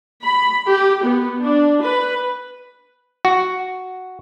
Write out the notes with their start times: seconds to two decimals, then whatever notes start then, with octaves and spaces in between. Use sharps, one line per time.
0.21 B5
0.68 G4
1.02 B3
1.42 D4
1.81 B4
3.25 F#4